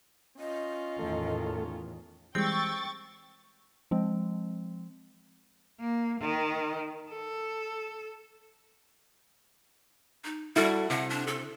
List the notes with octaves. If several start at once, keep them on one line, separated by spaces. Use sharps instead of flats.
C#4 F4 D#5
E2 A2 D#3 A3 A4
E3 G3 G#3 C4 G5 C#6 E6 A6
F3 G#3 C4
A#3
D#3
A4
D#4
G3 E4 F#4 A4
C3 F#5
D4
A4